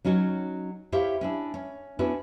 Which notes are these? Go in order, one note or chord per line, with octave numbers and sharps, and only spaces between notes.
F#3 C#4 D#4 F#4
E4 G4 C5 C#5 E5 F5
C#4 D4 E4
C#4
B3 C#4 D4 E4 F#4